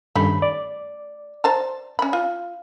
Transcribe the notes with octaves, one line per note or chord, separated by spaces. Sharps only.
G2 D#3 A3 C#4 B5
D5
C5 A5 A#5
C#4 B5
F4